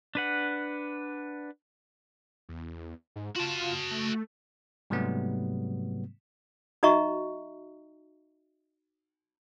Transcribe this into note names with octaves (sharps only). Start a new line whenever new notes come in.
D4 B4 F#5
E2
G#2
F4 F#4 A5
A3
G#2 C3 F#3 G3 A3 B3
D#4 F#4 D#5 E5 A#5 C#6